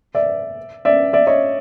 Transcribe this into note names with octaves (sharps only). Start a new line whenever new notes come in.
D5 E5
D5 E5
D5 E5
C#5 D#5